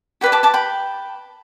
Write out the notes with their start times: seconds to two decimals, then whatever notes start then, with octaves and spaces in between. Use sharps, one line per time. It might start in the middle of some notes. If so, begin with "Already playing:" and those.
0.21 G4 B4 D5 G5
0.32 A5 D6
0.43 A5 D6
0.54 G5 B5